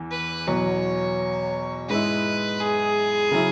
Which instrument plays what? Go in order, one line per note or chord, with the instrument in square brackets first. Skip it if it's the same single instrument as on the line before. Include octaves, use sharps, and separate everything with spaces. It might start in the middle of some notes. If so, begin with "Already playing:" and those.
Already playing: [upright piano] E2 E3
[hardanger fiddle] B4
[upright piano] E2 B2 F#3 [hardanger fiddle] C#5
[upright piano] G#2 G#3 E4 [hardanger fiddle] B4
[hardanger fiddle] G#4
[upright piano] C#3 F#3 E4